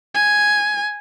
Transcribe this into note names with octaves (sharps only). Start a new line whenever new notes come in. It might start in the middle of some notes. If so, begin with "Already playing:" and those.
G#5